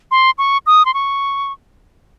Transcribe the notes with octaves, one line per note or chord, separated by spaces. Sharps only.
C6
C#6
D#6
C6
C#6